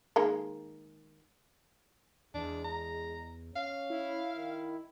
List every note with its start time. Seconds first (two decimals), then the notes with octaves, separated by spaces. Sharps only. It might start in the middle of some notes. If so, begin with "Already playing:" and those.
0.16 D#3 G#3 A#3
2.34 E2 G#3 D4
2.64 A#5
3.56 C#4 F5
3.90 E4
4.36 D#3